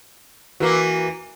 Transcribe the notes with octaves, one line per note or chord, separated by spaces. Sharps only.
E3 A#3 F#4 A#4